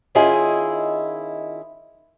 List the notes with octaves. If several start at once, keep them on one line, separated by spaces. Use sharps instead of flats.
D#3 C#4 E4 F4 G#4 D#5